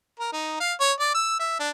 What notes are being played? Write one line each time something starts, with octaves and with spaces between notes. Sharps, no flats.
A#4
D#4
F5
C#5
D5
E6
E5
D4